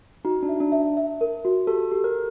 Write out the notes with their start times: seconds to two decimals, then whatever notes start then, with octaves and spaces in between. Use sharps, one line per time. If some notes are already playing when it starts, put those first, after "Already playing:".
0.25 D#4 F#4
0.43 D4
0.49 E5
0.60 D4
0.72 E5
0.97 E5
1.21 A#4
1.45 F#4
1.67 G4 A4
1.92 G4
2.04 A#4